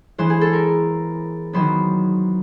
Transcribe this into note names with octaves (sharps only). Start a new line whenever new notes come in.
E3 G#3 B3 C5
G#4
A4
A#4
D#3 F#3 B3 C5